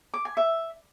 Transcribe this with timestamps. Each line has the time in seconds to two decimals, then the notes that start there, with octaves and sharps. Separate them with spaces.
0.14 D6
0.25 G#5
0.37 E5